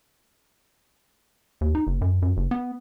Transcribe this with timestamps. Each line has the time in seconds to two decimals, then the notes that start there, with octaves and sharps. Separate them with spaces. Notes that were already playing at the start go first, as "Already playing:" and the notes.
1.61 D#2
1.75 D#4
1.87 F#1
2.01 F#2
2.22 F#2
2.37 F#1
2.51 B3